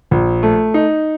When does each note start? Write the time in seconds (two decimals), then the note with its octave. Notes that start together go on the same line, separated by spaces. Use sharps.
0.11 A#1
0.43 A3
0.74 D#4